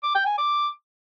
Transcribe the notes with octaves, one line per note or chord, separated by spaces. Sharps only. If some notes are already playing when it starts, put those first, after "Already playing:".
D6
G5
G#5
D6